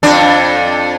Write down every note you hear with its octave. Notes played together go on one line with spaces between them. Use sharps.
F2 D4